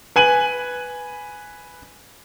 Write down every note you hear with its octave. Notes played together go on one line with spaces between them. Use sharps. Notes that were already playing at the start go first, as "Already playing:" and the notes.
B4 G#5 D#7 F#7